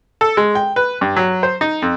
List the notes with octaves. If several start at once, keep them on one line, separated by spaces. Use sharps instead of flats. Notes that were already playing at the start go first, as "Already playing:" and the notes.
A4
G#3
G5
B4
G2
F#3
C5
D#4
F2